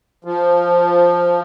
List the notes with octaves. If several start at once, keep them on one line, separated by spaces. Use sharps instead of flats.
F3